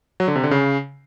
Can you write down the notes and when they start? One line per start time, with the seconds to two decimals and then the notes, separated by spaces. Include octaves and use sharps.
0.20 F#3
0.28 D3
0.36 C3
0.43 D3
0.51 C#3